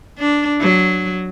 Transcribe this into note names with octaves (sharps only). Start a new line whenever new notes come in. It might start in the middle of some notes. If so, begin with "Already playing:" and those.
D4
F#3